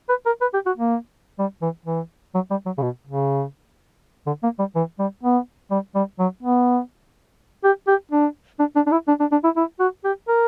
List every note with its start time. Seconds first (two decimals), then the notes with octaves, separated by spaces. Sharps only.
0.09 B4
0.26 A#4
0.41 B4
0.54 G4
0.66 F#4
0.78 A#3
1.39 G3
1.62 E3
1.86 E3
2.35 F#3
2.51 G3
2.66 F#3
2.78 C#3
2.82 B2
3.07 C#3
4.27 D3
4.43 A#3
4.59 G3
4.75 E3
4.99 G3
5.23 B3
5.71 G3
5.95 G3
6.19 F#3
6.43 B3
7.64 G4
7.88 G4
8.11 D4
8.59 D4
8.76 D4
8.87 D4
8.92 E4
9.08 D4
9.20 D4
9.32 D4
9.44 E4
9.56 E4
9.80 F#4
10.05 G4
10.28 A#4